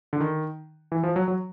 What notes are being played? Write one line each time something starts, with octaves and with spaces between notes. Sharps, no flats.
D3
D#3
E3
F3
F#3
F#3